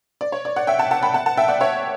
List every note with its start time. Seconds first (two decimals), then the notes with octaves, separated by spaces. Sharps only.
0.21 D5
0.32 C#5
0.45 D5
0.56 D5 F#5
0.67 E5 G5
0.79 F#5 A5
0.91 F#5 A5
1.02 G5 B5
1.14 F#5 A5
1.26 F#5 A5
1.37 E5 G5
1.48 D5 F#5
1.60 C#5 E5